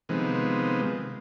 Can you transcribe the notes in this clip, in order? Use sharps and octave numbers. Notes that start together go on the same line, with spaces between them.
C3 D#3 F3 G#3 B3